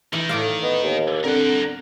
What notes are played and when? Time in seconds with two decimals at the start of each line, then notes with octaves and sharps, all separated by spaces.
0.13 D#3 E3
0.29 A2 D5 F5
0.63 B3 D#5
0.83 D#2
1.24 D3 C4 A#4 F#5